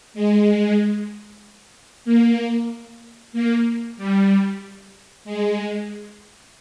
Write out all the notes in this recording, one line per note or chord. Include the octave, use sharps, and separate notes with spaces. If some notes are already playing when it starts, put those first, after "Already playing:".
G#3
A#3
A#3
G3
G#3